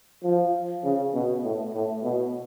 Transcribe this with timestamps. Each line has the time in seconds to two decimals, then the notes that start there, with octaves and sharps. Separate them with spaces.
0.23 F3
0.84 C#3
1.14 B2
1.43 A2
1.73 A2
2.04 B2